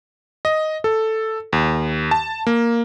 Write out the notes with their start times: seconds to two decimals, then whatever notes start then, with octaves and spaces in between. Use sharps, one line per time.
0.45 D#5
0.84 A4
1.53 D#2
2.11 A5
2.47 A#3